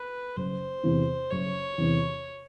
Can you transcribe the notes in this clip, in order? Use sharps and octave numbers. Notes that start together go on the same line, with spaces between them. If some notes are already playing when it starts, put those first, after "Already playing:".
Already playing: B4
F#1 C5
E2 C3 E3
F#1 C#5
E2 C3 E3